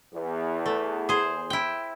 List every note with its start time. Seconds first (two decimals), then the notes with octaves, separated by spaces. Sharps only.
0.13 E2
0.66 A3
1.09 G#4 C5
1.50 E4 G5